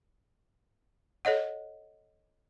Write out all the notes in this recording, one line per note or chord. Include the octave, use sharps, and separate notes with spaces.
A4 C#5 D#5 F#5